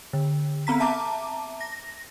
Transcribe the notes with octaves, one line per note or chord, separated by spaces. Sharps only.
D3
B3 C4 A#5 B6
E5 A5 A#5 D6
A#6